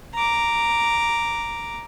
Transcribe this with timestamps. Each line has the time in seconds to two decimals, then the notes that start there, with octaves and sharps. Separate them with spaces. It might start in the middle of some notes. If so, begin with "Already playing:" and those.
0.14 A#5 D6